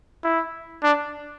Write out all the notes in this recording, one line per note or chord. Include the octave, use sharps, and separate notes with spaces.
E4
D4